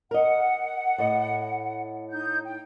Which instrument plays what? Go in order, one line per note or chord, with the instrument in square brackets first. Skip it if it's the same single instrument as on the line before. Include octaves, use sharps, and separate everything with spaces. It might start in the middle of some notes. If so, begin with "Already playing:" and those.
[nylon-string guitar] A#4 D#5 [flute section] F#5
[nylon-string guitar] A2 D#5
[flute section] D#4 G6
G5